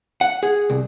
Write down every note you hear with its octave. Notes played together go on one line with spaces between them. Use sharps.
F#5
G#4
C2